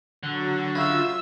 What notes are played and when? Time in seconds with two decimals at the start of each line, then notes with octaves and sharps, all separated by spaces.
0.23 D3 F#3 F#4
0.75 C#3 F4 E5 E6